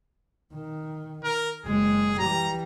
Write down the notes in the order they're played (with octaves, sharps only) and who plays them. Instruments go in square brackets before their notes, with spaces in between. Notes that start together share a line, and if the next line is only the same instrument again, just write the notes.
[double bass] D#3
[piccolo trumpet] A#4
[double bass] F#1 G#3 [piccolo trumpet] G#4
[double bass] E3 G3 [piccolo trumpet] A#5